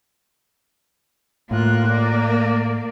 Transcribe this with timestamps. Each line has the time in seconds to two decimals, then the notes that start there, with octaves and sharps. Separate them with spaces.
1.51 A2 A#3 F4 F#6
1.88 D5